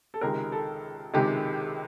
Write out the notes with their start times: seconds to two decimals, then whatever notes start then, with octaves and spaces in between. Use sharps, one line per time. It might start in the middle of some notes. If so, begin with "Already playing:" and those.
0.14 A4
0.21 C#2 C3 D#3 G#3 A#4
0.52 A4
1.14 C#2 C3 D#3 G#3 G4